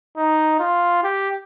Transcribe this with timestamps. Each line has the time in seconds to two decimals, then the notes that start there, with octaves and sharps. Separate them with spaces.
0.17 D#4
0.60 F4
1.03 G4